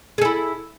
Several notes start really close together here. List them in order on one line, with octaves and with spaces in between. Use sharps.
G#4 A4 E4